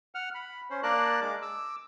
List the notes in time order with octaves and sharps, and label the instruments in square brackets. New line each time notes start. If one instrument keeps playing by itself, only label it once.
[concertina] F#5 F6
B5
C#4 C5
A#3 D4 A#4 D5 A5 F#6
G#3 D6
D6 E6